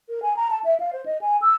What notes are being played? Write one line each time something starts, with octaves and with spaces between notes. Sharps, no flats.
A#4
G#5
A#5
A5
E5
F5
C5
D#5
G#5
E6